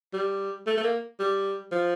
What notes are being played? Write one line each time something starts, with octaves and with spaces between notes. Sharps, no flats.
G3
A3
A3
A#3
G3
F3